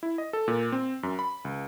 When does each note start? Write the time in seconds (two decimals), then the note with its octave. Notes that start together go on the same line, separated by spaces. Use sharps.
0.03 E4
0.18 D#5
0.33 A4
0.48 A#2
0.72 C4
1.03 F#2
1.19 B5
1.45 C#2